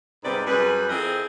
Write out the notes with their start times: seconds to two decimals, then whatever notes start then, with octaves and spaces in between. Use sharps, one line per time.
0.24 G#2 C3 G3 B3 B4 D5
0.47 F#2 G3 G#4 B4
0.90 F2 C4 E4 G#4 A#4 D#5